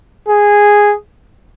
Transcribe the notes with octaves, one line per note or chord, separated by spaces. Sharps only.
G#4